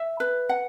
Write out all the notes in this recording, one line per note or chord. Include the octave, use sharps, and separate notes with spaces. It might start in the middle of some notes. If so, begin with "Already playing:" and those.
Already playing: E5
B4
F#5